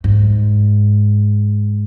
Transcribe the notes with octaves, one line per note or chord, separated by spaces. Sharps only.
G#2